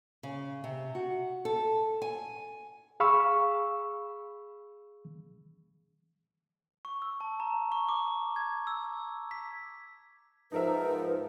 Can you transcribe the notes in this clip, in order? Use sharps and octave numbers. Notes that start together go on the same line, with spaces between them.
C#3
C3
F#4
A4
G#5
G#4 F5 B5 C#6 E6
C#6
E6
A5
A#5
C#6
D6
G#6
E6
B6
G#2 F3 D#4 A#4 B4 E5